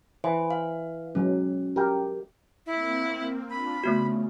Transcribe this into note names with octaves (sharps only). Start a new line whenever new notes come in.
E3 C5
F5
F#3 G#3 C#4
G4 A#4 G5
A#3 C4 E4
D4 F4 B5
C#3 A3 B3 F#4